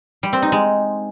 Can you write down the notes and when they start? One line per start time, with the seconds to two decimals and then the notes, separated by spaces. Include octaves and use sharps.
0.23 G3
0.33 C4
0.42 D#4
0.52 G#3